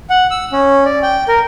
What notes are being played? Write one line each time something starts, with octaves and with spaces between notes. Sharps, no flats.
F#5
E6
C#4
D5
G5
A#4